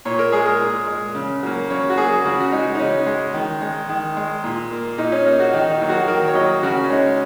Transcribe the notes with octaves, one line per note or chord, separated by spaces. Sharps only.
A#2 C#5
A#4
G#3 G#4
A#4
A#2
G#3
C#3
F#3 A#3
C#3 C#5
F#4
F#3 A#3 G#4
C#3 F#4
F#4
G#3 D#4
D#4
C#3 C#4
G#3
D#3
G#3
D#3
G#3
A#2
A#3
A#2 D#4
C#4
A#3 D#4
F#4
D#3 D#4
D#4
F#3 A#3
F#4
D#3 A#4
C#5
F#3 A#3 D#5
C#3 F#4
C#4
G#3 D#4